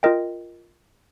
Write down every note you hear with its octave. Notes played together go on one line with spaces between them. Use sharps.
F4 A#4 D#5 G5